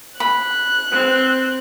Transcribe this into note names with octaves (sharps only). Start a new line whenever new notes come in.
B5 F#6
C4